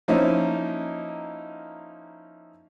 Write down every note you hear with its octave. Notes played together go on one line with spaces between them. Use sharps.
F3 A#3 C#4 D#4 E4